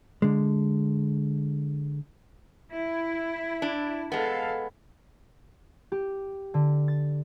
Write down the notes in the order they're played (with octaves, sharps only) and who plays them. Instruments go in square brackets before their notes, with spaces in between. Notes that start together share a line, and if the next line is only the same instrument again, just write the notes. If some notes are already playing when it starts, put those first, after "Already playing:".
[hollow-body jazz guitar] D3 G#3
[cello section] E4
[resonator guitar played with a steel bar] D4
[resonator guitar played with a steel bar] G#3 B3 [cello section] A4 F5
[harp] G4
D3
A6